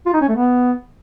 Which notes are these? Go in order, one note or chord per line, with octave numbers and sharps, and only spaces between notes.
F4
D#4
C#4
A3
B3